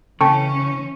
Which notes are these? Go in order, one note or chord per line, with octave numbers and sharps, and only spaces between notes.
C#3 E3 C#4 A4 G5 A5 C#6